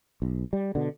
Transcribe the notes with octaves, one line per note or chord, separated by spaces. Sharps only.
B1
G3
B2 D3